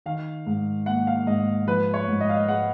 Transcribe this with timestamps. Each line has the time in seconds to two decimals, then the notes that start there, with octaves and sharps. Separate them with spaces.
0.06 D#3 F5
0.46 G#2
0.86 A#3 F#5
1.07 F5
1.26 G#2 D#5
1.67 F3 B4
1.94 C#5
2.08 G#2
2.20 D#5
2.29 F5
2.36 D#5
2.48 G#3 F#5